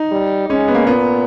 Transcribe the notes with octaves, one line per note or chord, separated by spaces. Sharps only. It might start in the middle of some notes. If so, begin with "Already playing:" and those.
Already playing: D#4
G3
G#3 C#4
B3
A#3
A#2 B3